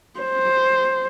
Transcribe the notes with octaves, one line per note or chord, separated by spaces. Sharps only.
C5